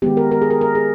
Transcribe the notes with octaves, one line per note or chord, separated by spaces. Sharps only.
D#3 G#3 B3 G4
A#4
A#4
G#4
A#4
A#4
G#4